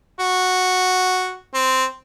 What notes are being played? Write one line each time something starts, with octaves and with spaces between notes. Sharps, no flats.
F#4
C4